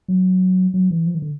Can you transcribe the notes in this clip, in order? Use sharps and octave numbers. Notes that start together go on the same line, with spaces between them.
F#3
F#3
E3
F3
D#3
D3